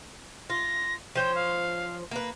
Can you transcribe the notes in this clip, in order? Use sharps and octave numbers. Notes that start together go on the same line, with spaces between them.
F4 A#6
F3 C5 C#5 G5
F5
A#3 B4